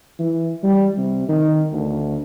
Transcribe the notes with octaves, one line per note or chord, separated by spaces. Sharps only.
E3
G3
C3
D#3
D2